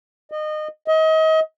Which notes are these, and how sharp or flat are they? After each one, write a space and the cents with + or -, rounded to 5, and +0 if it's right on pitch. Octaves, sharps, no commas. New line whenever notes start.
D#5 -25
D#5 +35